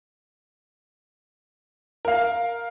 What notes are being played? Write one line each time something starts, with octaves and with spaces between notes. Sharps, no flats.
A#4 F5